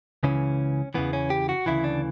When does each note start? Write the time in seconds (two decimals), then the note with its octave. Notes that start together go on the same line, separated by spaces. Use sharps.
0.23 C#2 C#3 E3 C#4
0.94 E2 C#3 E3 B3
1.13 C#4
1.30 G4
1.49 F#4
1.66 D2 C#3 E3 E4
1.84 D4